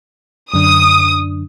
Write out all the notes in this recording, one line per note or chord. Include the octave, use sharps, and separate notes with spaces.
F#2 D3 D4 D#6